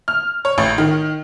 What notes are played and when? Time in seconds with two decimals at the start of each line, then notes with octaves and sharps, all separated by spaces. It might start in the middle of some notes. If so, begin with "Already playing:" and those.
0.08 F6
0.45 C#5
0.58 A1
0.78 D#3